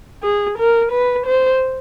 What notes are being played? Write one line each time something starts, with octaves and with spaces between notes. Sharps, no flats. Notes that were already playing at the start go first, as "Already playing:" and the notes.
G#4
A#4
B4
C5